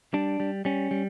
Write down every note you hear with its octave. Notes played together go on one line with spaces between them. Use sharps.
G3 D4
G3
G3 C#4
G3